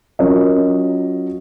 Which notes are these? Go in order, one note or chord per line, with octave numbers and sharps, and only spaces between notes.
F#3 C#4 F4 A#4 D#5